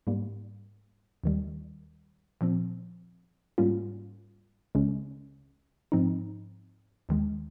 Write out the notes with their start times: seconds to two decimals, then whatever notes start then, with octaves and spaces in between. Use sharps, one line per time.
0.07 G#2 G3 A#3
1.24 D#2 D#3 G3
2.41 A#2 F3 C4
3.58 G#2 G3 A#3 C#4 F4
4.75 C#2 C#3 G#3 C#4
5.92 G#2 F3 C4 D#4
7.09 D#2 D#3 G#3